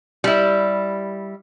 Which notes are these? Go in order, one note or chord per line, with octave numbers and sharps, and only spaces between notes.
G3 E4